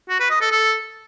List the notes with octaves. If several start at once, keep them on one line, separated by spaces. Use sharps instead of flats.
F#4
B4
D#5
A4
A4